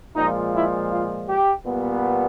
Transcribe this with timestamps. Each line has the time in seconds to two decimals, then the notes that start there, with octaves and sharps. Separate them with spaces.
0.16 A#2 F3 G#3 D#4
0.54 E4
0.91 F4
1.28 G4
1.64 A#2 G3 B3